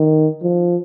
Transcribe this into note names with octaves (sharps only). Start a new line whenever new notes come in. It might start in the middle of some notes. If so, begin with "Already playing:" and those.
Already playing: D#3
F3